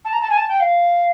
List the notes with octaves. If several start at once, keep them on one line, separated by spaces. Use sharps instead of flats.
A5
A#5
A5
G#5
A5
G5
F5